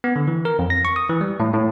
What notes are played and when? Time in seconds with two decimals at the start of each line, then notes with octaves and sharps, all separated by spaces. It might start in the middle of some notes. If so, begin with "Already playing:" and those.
0.04 B3
0.16 D3
0.27 E3
0.45 A#4
0.59 F2
0.70 A#6
0.85 C#6
0.96 D#6
1.09 E3
1.21 G3
1.40 A2
1.54 A2